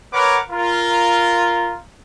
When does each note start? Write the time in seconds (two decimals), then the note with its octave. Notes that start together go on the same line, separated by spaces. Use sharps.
0.12 A#4 B4 C#5 F#5 D6
0.50 F4 A#4